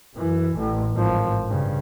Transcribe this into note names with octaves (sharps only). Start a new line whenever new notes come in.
F#2 E3
A1 A2
G#1 F3
G2 C#3